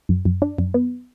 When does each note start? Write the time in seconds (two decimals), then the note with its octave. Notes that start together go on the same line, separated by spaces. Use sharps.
0.09 F#2
0.25 F#2
0.42 D4
0.58 F#2
0.74 B3